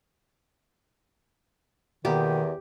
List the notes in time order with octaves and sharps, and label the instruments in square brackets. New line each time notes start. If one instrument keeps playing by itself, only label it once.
[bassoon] E2 [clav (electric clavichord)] B2 A#3 B3 [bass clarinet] D#3 [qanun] G4